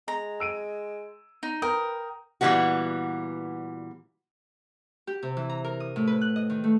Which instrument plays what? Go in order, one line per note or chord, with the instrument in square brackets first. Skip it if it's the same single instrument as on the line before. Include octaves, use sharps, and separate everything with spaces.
[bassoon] G#3 [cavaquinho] A#5
[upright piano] E6 D7 D#7
[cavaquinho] D#4
[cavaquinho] A#4 G5 [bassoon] B4 [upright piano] D#6
[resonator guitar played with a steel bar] A#2 E3 F#3 G3 B3 F#4
[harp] G4
C3
E3
A#5
A#4
D#6
A2
B4
F#6
D#5
D#3
A3